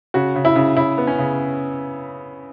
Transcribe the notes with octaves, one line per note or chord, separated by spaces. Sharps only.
C#3 F#4
C#3
E4
C#3
C#3 E4
B3
C#4
C#3